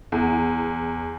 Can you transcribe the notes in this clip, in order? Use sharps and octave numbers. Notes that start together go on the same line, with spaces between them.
E2